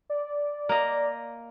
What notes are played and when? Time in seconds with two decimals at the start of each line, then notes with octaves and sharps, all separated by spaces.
0.10 D5
0.69 A#3 D#5